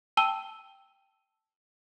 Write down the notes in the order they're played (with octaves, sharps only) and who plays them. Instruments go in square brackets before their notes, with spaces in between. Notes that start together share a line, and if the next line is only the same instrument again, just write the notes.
[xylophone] G5 A5 E6 D#7 G7